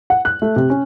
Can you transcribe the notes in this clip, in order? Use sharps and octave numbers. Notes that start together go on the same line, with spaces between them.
F#5
F#6
A3
C3
C#4